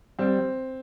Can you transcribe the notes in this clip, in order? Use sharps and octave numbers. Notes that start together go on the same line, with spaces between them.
G3 C4